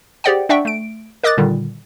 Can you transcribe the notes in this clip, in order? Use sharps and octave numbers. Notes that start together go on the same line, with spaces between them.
G4 G#4 C5 D5 F#5 G5
D4 D5 E5 F#5 G5 C#6
A3 D7
A#4 D#5 D6 D#6 F#6 A6
A#2 D3 D#3 G3